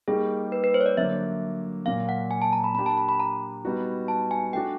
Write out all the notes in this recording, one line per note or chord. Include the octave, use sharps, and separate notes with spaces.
G3 A#3 D#4 G4 G#4
B4
B4
C5
C#5
D5
D3 F#3 A#3 E5
A#2 F#3 A#3 F5
F#5
G#5
A5
A#5
B5
A#3 D4 G4 B5
A5
B5
B5
A#5
G3 B3 D#4 F#4
A5
G#5
A3 D4 F#4 G5